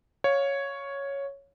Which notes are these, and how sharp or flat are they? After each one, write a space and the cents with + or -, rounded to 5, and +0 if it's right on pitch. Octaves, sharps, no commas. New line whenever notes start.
C#5 +0 F5 +15